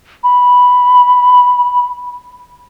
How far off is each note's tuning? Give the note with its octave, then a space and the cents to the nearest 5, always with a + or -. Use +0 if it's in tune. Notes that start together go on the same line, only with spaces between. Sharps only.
B5 +0